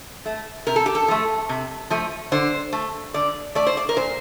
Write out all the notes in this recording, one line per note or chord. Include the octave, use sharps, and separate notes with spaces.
A3
C3 A#4
A4
G4
A4
F3 A3
C3
F3 A3
D3 C5
A3
D3 D5
A3 D5
C5
D5
A#4
A#2 C5